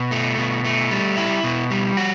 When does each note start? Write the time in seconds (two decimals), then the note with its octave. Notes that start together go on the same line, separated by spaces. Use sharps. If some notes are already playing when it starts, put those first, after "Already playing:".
Already playing: B2
0.11 A3
0.37 B2
0.64 A3
0.91 G3
1.17 E4
1.44 B2
1.71 G3
1.97 F#4